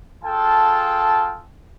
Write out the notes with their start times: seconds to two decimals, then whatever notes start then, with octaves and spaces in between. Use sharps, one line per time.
0.24 F4 G#4 A4 F5 G5 A5